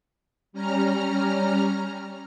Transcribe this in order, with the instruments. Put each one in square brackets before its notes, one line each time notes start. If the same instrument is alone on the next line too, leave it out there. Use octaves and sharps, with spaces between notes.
[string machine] G3 C#4 A#5 F6